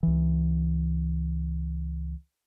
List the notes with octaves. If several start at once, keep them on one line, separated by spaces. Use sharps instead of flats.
C#2 E3